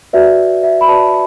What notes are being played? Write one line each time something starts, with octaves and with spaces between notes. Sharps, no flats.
F#4 B4 D5 E5
E5
B5
F#4 B4 D5 A5